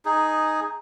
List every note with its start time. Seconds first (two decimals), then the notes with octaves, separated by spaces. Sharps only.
0.05 D#4 G#4